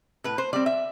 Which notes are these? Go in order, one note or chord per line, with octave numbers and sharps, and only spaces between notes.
A2 B4
C5
G3 C4 D5
E5